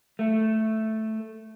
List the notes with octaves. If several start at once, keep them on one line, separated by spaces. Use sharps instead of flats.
A3